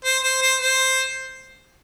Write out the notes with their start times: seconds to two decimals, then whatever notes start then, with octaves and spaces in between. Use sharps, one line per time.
0.05 C5
0.24 C5
0.42 C5
0.61 C5